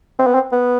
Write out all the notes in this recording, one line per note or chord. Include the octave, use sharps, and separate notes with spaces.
C4
B3
C4
B3